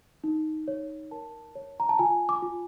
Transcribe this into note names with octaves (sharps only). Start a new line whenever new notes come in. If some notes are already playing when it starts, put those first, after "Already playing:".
D#4
C#5
A#4 A5
C#5
A#5
A5
F4 G#5
D6
F4